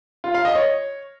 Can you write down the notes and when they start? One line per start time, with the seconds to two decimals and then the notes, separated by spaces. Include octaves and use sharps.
0.24 F4
0.34 F5
0.45 D#5
0.55 C#5